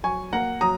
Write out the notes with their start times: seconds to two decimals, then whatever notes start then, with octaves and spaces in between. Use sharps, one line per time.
0.03 F#3 G#5 C#6
0.32 A#3 F#5 A#5
0.61 F#3 A#5 D#6